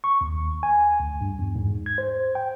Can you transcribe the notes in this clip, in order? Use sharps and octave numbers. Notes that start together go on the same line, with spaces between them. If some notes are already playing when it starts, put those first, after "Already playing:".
C#6
D#2
G#5
D2
G2
E2
G#2
G#6
C5
G5